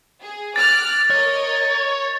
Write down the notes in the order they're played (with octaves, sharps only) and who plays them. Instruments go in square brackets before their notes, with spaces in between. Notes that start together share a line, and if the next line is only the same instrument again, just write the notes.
[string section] G#4
[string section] D6 F6 F#6 [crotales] A6
[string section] A#4 D#5 [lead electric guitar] C#5